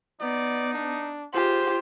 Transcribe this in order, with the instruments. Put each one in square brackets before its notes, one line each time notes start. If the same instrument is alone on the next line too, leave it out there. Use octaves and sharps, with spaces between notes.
[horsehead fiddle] B3 [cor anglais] D#4 [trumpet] D5
[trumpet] D4
[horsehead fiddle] F4 [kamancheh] G4 [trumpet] G#4 [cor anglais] C5